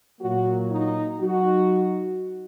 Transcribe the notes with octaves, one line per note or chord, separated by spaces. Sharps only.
A#2 F#3 A#3 F#4
D#4
F#3 D#4 F#4